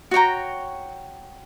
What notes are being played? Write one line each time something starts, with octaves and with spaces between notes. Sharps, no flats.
F#4 C#5 G5 A#5